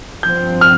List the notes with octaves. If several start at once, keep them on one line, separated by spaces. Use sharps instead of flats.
G2 F3 C4 G6
F6